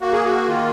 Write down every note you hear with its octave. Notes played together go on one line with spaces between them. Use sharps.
A#3 F#4
G#4
F#4
D#3 F4